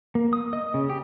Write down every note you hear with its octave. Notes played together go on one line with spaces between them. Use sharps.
A#3
D#6
D#5
C#3
G4